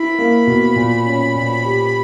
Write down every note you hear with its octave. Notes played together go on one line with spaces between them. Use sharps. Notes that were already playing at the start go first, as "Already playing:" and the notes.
Already playing: E4 B5
A#3
B2
A#2
C#4
A#2
G4